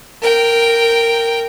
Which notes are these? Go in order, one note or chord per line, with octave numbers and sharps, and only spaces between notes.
A#4 G5